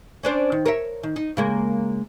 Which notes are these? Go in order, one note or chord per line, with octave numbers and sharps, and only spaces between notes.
C#4 D4 C5
D#3
A#4 C#5 E5
D#3
D#4
C#3 G#3 A#3